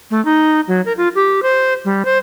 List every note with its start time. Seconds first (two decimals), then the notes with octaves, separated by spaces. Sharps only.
0.11 A3
0.25 D#4
0.68 F#3
0.86 A#4
0.97 F4
1.15 G4
1.43 C5
1.85 G3
2.05 C5